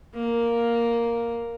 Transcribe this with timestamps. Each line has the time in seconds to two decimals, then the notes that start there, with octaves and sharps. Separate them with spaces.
0.14 A#3